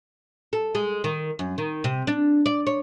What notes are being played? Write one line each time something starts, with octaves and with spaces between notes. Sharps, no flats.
A4
G#3
D#3
F#2
D#3
C3
D4
D5
C#5